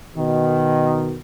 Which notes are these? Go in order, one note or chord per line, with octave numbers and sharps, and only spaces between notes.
B2 D#3